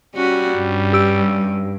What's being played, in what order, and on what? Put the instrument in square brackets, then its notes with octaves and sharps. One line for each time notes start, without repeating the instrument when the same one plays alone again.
[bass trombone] G3 [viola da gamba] C#4 F#4
[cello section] G2 [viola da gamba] C#4
[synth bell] G4 E6 D7